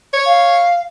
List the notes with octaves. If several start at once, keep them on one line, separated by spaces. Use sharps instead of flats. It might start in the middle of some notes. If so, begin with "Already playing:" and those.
C#5
F5